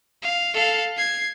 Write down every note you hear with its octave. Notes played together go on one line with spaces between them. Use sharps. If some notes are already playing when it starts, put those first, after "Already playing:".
F5
A4 F5
G#6 C7